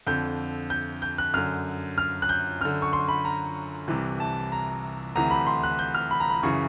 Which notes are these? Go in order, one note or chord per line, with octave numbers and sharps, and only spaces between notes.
F2 D3 G6
G6
G6
F#6
F#2 D3 F6
F6
F#6
G6
F#2 D3 F6
C#6
C6
B5
A#5
C2 C3 E3
A5
A#5
D2 C3 E3 A#5
B5
C6
F#6
G6
F6
B5
A#5
B5
F#2 C#3 E3 C#6